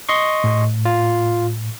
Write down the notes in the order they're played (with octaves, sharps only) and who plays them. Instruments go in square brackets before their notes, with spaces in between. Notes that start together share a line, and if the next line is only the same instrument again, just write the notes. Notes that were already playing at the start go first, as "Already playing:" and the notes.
[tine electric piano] D#5 C6 C#6
[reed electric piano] A2
[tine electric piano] F4